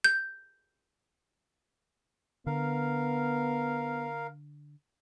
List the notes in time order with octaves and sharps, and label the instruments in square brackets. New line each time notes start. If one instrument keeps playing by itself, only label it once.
[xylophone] G6
[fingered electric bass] D3 [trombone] B3 [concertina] A#4 F5